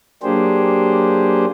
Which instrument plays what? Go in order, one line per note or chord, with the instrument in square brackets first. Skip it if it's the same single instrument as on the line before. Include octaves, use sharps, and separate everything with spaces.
[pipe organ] F#3 A#3 D4 G4 G#4 C5